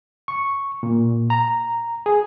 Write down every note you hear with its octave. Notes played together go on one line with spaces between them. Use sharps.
C#6
A#2
A#5
G#4